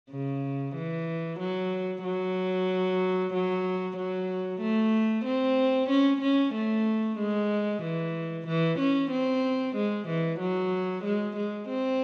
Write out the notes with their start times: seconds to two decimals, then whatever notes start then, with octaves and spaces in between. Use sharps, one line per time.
0.11 C#3
0.75 E3
1.39 F#3
2.04 F#3
3.33 F#3
3.97 F#3
4.61 A3
5.25 C4
5.90 C#4
6.21 C#4
6.54 A3
7.18 G#3
7.83 E3
8.47 E3
8.79 C#4
9.11 C4
9.76 G#3
10.08 E3
10.40 F#3
11.04 G#3
11.36 G#3
11.68 C4